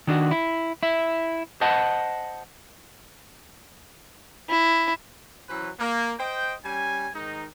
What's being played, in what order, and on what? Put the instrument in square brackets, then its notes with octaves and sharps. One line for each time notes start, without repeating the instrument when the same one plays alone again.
[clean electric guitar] D#3 D4 F#4
E4
E4 E5
C5 D#5 F#5 A5
[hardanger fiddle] E4
[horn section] E3 F#3 C#4 B4 C5
A#3
C5 D#5 G5
G3 C#4 G#5
G#2 D#3 D#4